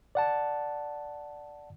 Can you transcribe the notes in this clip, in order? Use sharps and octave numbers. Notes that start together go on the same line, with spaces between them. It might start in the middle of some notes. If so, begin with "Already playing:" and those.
D5 F#5 A5